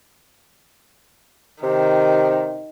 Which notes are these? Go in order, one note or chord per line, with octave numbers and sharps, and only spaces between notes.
C3 D#3